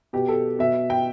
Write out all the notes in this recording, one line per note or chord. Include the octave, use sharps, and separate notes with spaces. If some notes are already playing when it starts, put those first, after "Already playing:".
B2 G4
A4
B2 E5
G5